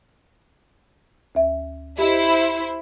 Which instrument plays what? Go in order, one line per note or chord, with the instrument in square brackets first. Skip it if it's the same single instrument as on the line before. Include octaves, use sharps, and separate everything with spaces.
[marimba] D2 E5
[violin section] E4 C5 [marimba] G4 D#5